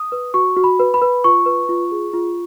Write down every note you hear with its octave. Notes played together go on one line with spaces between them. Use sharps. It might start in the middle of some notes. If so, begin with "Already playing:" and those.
Already playing: D#6
B4
F#4 C#6
F#4
B5
B4
B5
B4
F4 C#6
B4
F4
G#4
F4